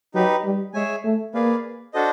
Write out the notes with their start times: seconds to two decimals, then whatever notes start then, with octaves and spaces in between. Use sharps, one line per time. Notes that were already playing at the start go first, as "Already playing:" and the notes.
0.15 F#3 D#4 G4 B4
0.44 G3
0.74 G#3 G#4 C#5 E5 G#5
1.04 A3
1.34 A#3 G#4 B4 D5 F5
1.94 D4 F#4 A4 C5 D#5